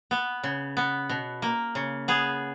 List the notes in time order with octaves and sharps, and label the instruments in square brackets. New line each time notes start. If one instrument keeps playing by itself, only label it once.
[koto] B3
C#3
B3
B2
A#3
C#3
B3 G#4